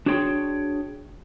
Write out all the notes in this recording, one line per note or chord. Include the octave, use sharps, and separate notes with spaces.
D4 F#4 G#4 C#5 G5 C6